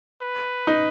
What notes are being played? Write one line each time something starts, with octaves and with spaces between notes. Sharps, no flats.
B4
D#4